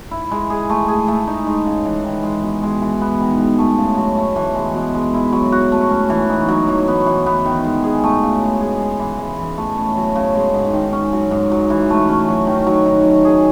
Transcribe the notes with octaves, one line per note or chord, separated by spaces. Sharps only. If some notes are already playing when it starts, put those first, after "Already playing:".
E4
G#3
G#4
A3
G#4
A3
D#4
G#3
C#3
E3
D#3
G#3
B2
G#3
E3
B3
D#3
G#3
A3
C#3
F#3
A3
E3
G#3
B2
G#3
E4
F#3
F#4
A3
C#4
E3
D#4
F#3
E3
B3
E3
B3
D#3
G#3
G#4
A3
C#3
G#3
G#4
G#3
E3
G#3
E3
A3
C#4
F#3
C#3
G#3
G#2
D#3
C#4
F#3
G#2
F#3
E3
A3
C#4
F#3
D#3
F#3
D#3
F#3
G#4